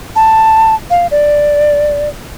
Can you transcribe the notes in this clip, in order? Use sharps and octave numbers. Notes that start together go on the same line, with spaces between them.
A5
F5
D5